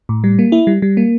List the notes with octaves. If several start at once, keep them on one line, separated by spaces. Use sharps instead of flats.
A2
G3
A#3
E4
G3
G3
A#3